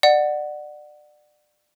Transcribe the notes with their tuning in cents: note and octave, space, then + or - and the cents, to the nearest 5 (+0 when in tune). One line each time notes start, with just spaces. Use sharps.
D5 +25 F#5 +0